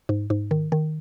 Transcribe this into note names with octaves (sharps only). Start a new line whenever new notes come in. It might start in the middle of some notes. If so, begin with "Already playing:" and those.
G#2
G#2
D#3
D#3